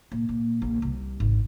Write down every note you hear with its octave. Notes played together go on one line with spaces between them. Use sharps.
A#2
A#2
A#1
C2
G#1